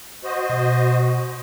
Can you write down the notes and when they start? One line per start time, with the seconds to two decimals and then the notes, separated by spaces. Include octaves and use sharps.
0.24 F#4 C5 D#5
0.49 B2